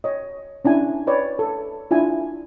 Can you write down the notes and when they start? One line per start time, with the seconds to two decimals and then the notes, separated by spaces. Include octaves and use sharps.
0.04 C#5 D#5
0.65 C#4 D4 E4 G#5
1.07 B4 C#5 D5
1.39 A4
1.91 D4 E4 F4 G#5